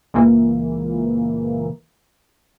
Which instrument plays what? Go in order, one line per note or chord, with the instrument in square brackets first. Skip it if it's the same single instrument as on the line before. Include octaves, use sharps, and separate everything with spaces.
[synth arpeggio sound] C#2 A#2 E3 A#3